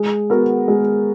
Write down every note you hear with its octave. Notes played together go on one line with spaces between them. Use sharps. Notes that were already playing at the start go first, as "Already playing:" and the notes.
Already playing: G#3
B3 F#4 A#4
G#3